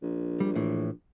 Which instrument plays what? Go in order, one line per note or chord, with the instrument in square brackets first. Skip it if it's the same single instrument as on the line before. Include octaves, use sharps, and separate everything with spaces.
[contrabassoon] A#1
[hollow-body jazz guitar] G3
A2 E3